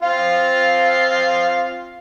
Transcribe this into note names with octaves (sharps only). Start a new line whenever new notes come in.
C4 F4 F5